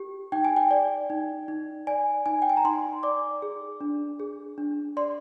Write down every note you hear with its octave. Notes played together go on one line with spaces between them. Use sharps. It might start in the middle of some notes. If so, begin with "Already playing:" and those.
Already playing: G4
D#4 G5
G#5
G5
D5
D#4
D#4
D5 G#5
D#4 G#5
G5
G#5
A#5
D#4 C6
D5 D6
G#4
D4
G#4
D4
D5 C6